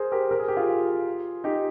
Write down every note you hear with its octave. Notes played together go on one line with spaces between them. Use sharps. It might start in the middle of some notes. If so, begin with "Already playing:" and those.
Already playing: G#4 A#4 C5
G4 A#4
A#4
G#4
G4
F4 G#4
D#4 G4